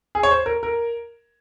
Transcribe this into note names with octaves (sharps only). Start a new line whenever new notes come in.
G#4
C#5
C5
A#4
A#4